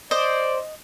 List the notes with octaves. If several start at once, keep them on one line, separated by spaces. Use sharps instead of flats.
C5 D5 D#5